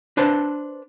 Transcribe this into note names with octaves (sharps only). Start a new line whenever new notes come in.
D4 B4 C5 A5